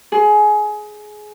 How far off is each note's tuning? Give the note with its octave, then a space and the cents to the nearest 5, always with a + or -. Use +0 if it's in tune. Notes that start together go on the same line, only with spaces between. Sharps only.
G#4 +20